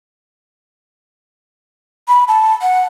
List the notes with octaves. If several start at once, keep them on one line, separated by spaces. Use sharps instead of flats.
B5
A5
F#5